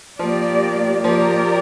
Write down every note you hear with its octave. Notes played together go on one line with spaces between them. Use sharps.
F3 A#3 G4 D5
F3 A#3 G4 A#4 D5